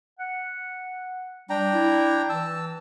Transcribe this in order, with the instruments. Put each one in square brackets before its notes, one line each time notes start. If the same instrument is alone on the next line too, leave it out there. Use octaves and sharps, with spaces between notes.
[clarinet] F#5
[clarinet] G3 [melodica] D4 G5 A#5
[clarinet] E4
[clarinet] E3 [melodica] A5 E6